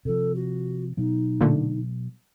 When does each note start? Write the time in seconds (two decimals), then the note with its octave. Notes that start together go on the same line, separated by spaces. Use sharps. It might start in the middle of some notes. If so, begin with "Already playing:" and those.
0.05 C3 F3 A4
0.34 F#4
0.97 B2 F#3 B3 D#4
1.41 A#2 D3 A3